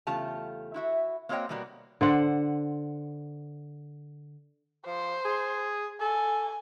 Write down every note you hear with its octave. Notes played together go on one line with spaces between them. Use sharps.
E2 C#3 A3 F4 G4 A5
E4 F#4 E5
A#3 C4 F#4 C#5 D#5 G5
B2 G3 A#3 B3 F#4 D5
D3 C5 F#5
F3 C5
G#4
A4 G#5